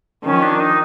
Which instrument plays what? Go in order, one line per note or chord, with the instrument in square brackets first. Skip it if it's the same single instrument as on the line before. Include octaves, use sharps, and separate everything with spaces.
[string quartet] D#3 F3 [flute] C#4
[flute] D4
D#4